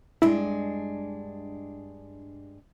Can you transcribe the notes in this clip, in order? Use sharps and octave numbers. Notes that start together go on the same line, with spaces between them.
G2 G#3 D4 E4